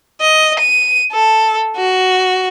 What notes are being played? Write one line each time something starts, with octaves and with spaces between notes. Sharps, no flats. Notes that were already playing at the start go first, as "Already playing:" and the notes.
D#5
D#7
A4
F#4